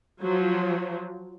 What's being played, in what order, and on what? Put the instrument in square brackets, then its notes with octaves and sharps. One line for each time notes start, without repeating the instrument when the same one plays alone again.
[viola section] F3 F#3